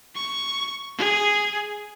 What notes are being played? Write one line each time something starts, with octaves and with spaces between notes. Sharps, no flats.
C#6
G#4